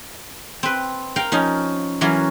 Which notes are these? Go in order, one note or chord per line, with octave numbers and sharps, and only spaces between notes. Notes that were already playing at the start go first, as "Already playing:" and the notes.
C4 B4
A#4 F5 G5
F3 C#4 D#4
E3 F#3 A#3 C#4